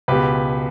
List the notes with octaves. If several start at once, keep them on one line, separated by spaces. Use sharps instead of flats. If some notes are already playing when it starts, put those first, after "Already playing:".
C#2 B2 G4 B4